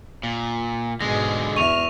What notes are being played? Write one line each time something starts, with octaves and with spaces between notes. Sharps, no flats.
A#2
G#2 B2 D3 G#3 G#4 A#6
E2 E5 C#6 F6 F7